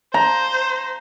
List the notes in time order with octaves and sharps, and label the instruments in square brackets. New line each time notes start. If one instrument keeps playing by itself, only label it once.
[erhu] C5 [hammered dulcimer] A#5